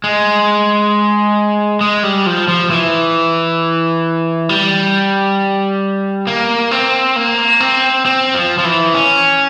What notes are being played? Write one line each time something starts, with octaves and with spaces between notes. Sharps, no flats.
G#3
G#3
G3
F3
F3
E3
G3
A#3
C4
A#3
C4
C4
F3
F3
E3
C#4